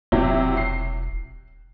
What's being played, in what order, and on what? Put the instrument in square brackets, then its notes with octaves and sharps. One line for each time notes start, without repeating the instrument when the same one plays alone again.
[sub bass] E1 [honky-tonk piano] C3 F#3 E4
[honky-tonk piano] C7